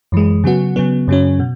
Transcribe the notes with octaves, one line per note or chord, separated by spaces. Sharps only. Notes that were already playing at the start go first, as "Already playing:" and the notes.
F#2 E3 G#3
C#3 F#3 B3 F#4
C#3 F#3 B3
F#2 C#3 F#3 C#4
B2